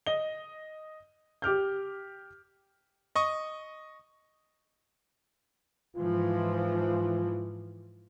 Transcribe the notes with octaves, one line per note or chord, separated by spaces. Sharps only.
D#5 G7
G4 D6 F6 G6
D#5 C#6 D#6
G#2 E3 F3 F4